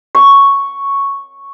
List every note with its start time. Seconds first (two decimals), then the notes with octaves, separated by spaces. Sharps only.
0.15 C#6